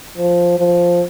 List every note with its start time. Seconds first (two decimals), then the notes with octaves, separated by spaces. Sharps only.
0.17 F3
0.59 F3